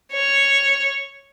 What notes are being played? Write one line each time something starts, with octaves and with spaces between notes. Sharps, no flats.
C#5